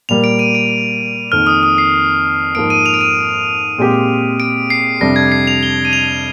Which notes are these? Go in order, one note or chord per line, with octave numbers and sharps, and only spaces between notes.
A#2 G3 A#3 F7
D7
D#7
D7
F2 D#3 A#3 F6
D#6
D#6
C7
G#2 F3 A#3 D7
D#7
F7
D7
D#7
A#2 G#3 C4 G4
D7
C7
F2 C3 G3 D4 A#6
G#6
C7
F7
G7
D#7
F7